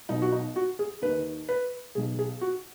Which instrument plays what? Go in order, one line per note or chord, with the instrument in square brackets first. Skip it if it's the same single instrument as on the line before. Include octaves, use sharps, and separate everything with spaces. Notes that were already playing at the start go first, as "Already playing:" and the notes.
[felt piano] B1 B2 D#4
F#4
D#4
F#4
G#4
D#2 D#3 B4
B4
B1 B2 G#4
G#4
F#4